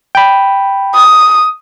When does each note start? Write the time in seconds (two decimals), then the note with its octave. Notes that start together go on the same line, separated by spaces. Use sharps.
0.15 G5 B5
0.95 D#6